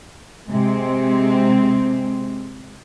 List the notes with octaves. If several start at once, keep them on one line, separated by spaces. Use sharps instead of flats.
C3 G#3 C4